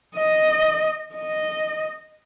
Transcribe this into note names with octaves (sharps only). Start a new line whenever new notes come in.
D#5
D#5